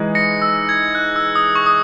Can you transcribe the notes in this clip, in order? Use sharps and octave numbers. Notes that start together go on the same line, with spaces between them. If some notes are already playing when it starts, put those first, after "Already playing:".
Already playing: E3 G#3 D#4
A#6 C#7
E6
G#6
F#6
E6
D#6
C#6
D#6